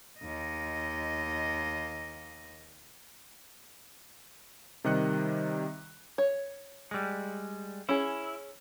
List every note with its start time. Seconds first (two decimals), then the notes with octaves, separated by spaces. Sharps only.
0.20 D#2 D#5
4.84 C3 D#3 G3 D#5 F#6 C#7
6.18 C#5
6.91 G3 G#3
7.89 C#4 E4 G#4